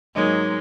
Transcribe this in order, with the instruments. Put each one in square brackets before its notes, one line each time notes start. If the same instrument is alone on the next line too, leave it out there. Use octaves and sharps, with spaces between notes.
[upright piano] G#2 F#3 A#3 D#4 [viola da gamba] G#3